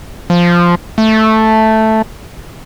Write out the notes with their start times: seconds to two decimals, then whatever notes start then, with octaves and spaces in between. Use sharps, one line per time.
0.30 F3
0.98 A3